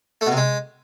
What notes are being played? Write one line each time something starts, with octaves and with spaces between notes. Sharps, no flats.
A3
B2
C3
G#3